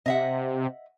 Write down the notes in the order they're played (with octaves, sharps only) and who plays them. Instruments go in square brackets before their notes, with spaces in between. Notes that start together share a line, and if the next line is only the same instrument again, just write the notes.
[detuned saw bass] C3 [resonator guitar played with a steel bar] D#5 E5 F#5